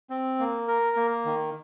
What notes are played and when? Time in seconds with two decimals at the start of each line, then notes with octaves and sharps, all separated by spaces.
0.10 C4
0.39 A#3
0.68 A#4
0.96 A#3
1.25 D#3